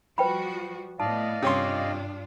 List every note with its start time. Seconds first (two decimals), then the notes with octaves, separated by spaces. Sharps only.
0.18 F3 G3 F#4 B4 G5 B5
1.00 A2 B3 D5 D#5 F5 A5
1.42 G2 C3 C#4 D4 F4 C6